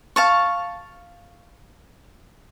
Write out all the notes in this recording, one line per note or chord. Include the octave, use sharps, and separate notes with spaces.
F5 A5 C#6